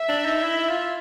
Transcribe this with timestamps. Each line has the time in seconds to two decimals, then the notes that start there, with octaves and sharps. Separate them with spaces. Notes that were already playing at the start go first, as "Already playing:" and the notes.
Already playing: E5
0.09 D4
0.26 D#4
0.43 E4
0.69 F4